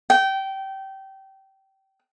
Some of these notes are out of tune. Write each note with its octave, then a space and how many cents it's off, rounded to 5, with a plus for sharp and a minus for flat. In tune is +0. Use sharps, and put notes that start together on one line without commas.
G5 -20